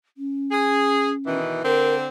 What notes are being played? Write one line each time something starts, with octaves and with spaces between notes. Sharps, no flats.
C#4
G#4
B2 D#3 E3
D3 C4 A#4